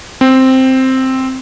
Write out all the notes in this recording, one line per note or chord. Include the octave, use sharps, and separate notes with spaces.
C4